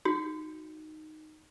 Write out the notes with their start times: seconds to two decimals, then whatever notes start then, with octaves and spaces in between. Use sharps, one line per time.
0.05 D#4 F#4